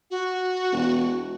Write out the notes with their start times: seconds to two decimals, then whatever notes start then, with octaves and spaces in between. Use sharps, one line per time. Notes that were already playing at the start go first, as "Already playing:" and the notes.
0.11 F#4
0.72 E1